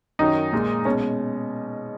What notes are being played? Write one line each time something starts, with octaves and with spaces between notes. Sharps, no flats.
F#2 D#3 F#3 D#4
A#2 G#3
B2 G#3 C#4